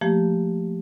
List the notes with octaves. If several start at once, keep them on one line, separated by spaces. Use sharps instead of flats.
F3 A3 A#3 G4